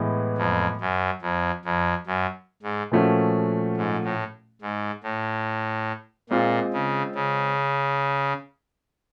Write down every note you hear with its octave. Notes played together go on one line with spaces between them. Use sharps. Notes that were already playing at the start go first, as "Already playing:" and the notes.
Already playing: A2 E3 G#3 B3
F2
F#2
F2
F2
F#2
G#2
A#2 F3 A3 C#4 F#4
G#2
A2
G#2
A2
A#2 G#3 C4 F4
C#3
C#3